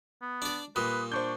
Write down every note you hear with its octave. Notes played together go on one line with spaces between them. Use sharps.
B3
D4 D5
A#2 G3 B4 D#6
D4 C5 C#6 G6